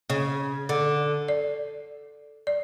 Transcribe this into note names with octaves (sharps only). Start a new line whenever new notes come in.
C#3
D3
D5
D5